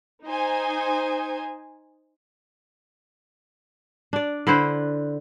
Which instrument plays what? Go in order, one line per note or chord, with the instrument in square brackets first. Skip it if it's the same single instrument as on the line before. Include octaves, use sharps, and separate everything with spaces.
[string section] D#4 C5 G#5
[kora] D4 D5
D3 E4 B4 C5